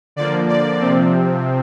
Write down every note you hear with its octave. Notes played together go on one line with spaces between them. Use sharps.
D3 F3 A#3 D5
D5
C3 F3 C4